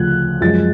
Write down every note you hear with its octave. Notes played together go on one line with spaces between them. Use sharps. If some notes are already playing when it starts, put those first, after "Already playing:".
Already playing: D2 C#3 F3 F#6 G#6
F#2 F3 G#3 A6